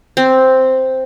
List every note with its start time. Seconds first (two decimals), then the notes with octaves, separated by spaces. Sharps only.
0.17 C4